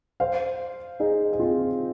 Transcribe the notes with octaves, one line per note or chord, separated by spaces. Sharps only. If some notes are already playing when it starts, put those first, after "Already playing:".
C5 F5
D#4 G#4
G#4
C4 F4